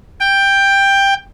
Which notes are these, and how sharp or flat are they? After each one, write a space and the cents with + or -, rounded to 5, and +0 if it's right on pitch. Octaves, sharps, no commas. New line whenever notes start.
G5 +10